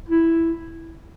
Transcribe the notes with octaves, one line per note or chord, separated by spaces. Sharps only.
E4